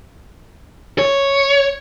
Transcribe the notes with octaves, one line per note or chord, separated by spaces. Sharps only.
C#5